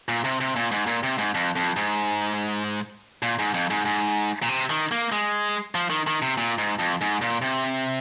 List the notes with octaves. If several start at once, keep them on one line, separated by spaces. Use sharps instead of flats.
A#2
C3
C3
A#2
G#2
A#2
C3
G#2
F2
F2
G#2
A#2
G#2
F2
G#2
G#2
A#2
C3
D#3
A#3
G#3
F3
D#3
D#3
C3
A#2
G#2
F2
G#2
A#2
C3